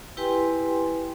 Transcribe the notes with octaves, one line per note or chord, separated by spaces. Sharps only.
E4 G4 B4 G5 G#5 C6